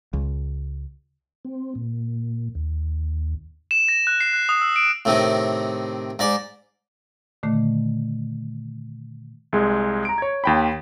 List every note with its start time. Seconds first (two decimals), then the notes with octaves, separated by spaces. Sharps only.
0.13 C#2
1.45 C4
1.75 A#2
2.55 D#2
3.71 E7
3.88 A#6
4.07 F#6
4.20 C7
4.33 F#6
4.49 D#6
4.61 E6
4.76 D7
5.05 A2 C3 D#3
6.19 G#2 D5
7.43 A#2 D3 D#3 A3
9.53 C2 G#3
10.05 A#5 D7
10.18 C#5 G#6
10.44 D#2 G5 B5